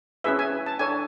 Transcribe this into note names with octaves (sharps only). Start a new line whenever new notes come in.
C#4 E4 G#4 B4 E5
G#5
A5
D4 A4 C#5 G#5